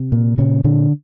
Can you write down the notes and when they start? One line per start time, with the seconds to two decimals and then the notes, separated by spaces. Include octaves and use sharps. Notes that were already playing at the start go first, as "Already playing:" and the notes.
Already playing: C3
0.12 A#2
0.38 A#2 C#3 C#4
0.64 A#2 D3 D4